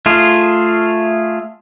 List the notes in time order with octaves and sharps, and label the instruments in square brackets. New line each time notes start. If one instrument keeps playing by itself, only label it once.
[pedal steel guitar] A3 F4 G#4